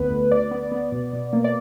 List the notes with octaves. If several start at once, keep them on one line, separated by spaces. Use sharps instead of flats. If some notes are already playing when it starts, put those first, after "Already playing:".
Already playing: D2 D3 B3 B4
D2
D2 D5
B3
B3
B2
B2
A#3
D5